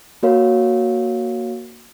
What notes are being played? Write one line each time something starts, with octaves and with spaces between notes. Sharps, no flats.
A#3 F#4 A#4 C#5 F5